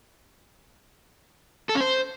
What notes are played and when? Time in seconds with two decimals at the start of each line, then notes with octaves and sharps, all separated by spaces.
1.69 A4
1.75 C#4
1.81 C5